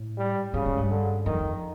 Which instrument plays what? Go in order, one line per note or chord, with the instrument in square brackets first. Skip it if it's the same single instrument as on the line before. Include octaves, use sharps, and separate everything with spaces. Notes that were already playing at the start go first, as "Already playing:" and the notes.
Already playing: [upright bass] A2
[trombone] G3
[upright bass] G#2 [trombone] C#3
[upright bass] G#2
G2
[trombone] D3
[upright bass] F2 [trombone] D#3